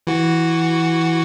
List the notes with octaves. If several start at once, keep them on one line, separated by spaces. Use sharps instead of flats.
E3 F#4